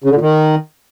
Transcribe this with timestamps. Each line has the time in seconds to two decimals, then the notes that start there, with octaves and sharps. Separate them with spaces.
0.04 C#3
0.10 D3
0.15 A#2
0.21 D#3